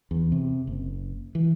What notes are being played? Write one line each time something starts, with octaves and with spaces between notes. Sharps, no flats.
E2
C3
F#1
E3